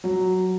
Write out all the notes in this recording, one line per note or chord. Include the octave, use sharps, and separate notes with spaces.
F#3